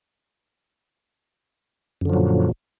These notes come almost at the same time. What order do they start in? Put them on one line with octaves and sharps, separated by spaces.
F#2 D3 F3 F#3 A#2